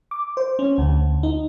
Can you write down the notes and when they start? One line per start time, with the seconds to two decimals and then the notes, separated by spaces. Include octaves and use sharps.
0.11 D6
0.37 C5
0.59 C#4
0.78 D2
1.23 D#4